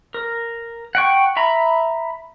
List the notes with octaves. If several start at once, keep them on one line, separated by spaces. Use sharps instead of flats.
A#4
F#5 G5 C#6
E5 A#5 B5